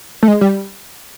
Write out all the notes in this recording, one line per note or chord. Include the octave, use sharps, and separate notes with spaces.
A3
G#3
G3